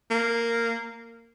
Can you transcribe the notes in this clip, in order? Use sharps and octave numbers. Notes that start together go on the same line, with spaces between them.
A#3